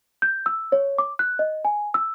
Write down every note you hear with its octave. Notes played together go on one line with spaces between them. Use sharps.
G6
E6
C#5
D6
F#6
D#5
G#5
E6